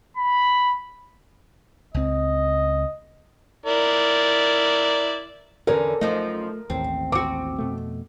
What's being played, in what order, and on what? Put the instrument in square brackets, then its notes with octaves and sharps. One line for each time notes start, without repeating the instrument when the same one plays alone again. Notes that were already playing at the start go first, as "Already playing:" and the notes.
[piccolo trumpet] B5
[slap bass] C#2 C4 [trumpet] D#5
[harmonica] E4 A#4 D5
[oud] E2 D3 C#4 [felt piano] A#4
[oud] F#2 F3 D#4 [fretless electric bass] A3
[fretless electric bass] A1 D#2 [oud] C4
[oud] C4 F#4 [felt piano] D6
[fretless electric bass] F2 B2 A3